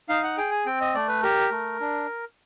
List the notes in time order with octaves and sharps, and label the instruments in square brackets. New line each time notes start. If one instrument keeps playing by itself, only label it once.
[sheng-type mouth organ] D#4 F5
F#5
G#4 G5
G#5
C4 G5
D#5
A3 D5
B4
G4 A#4
A3
D4